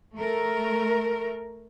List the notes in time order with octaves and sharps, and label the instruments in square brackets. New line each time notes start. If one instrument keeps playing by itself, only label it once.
[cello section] A3 A#4